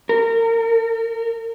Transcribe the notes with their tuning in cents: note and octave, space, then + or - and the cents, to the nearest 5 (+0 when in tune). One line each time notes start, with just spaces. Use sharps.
A#4 -35